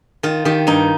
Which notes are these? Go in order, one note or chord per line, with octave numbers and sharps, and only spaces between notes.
D#3 F4
D#3 G4
G2 D#4